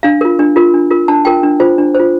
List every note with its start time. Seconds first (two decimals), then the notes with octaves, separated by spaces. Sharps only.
0.03 D4 F5
0.21 F4 A#4
0.39 D4
0.56 F4 A#4
0.74 D4
0.91 F4 A#4
1.08 D4 A5
1.25 F4 A#4 G5
1.43 D4
1.60 F4 C5
1.78 D4
1.95 F4 C5